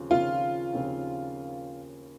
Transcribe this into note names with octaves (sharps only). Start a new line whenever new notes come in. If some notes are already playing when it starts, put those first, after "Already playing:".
Already playing: D#2 C#3 F3 C4
D#2 C#3 F3 C4 F4
D#2 C#3 F3 C4